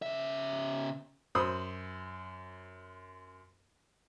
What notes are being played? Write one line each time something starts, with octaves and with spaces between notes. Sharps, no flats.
C#3 E5
F#2 C5 B5 D#6